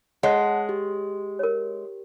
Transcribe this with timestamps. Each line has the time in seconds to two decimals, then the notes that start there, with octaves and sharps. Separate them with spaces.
0.23 G#3 C#5 F#5 A5 F#6
0.69 G4
1.39 A#4 C#5